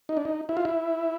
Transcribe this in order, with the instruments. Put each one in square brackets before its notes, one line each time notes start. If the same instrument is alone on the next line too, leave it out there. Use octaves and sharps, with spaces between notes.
[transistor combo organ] D#4
D4
D#4
E4
F4
E4